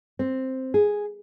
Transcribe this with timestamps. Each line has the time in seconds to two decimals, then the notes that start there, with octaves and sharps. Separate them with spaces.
0.19 C4
0.74 G#4